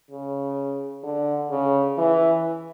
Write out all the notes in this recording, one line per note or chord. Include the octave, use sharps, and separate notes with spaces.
C#3
D3
C#3
E3